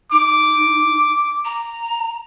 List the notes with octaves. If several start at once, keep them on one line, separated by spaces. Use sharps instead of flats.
D#4 D6
A#5